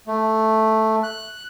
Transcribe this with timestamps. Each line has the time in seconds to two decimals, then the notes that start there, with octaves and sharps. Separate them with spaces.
0.07 A3
1.03 F#6